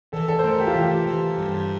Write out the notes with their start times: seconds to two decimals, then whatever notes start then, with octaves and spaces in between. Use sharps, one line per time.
0.13 E3 A4
0.28 A4
0.39 C5
0.44 A3 A#4
0.60 G4
0.67 F4
0.74 E3 G4
1.07 E3
1.38 G2